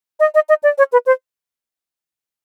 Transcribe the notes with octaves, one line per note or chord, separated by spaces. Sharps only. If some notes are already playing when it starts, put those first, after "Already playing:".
D#5
D#5
D#5
D5
C#5
B4
C5